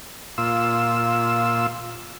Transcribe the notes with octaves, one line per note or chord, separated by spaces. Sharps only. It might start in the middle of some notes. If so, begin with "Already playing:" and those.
A#2 F4 E6